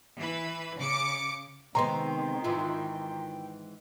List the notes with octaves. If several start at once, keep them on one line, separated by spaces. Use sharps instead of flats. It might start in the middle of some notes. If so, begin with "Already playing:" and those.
E3 B4
C#3 D6 C#7
C3 D#3 G#3 B3 G5 A#5 C6
G#2 E3 F4